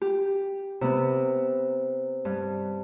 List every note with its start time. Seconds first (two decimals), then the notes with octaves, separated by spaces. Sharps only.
0.02 G4
0.81 C3 B3
2.25 G2